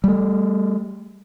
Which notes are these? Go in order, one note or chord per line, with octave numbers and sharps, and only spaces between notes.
G3 A3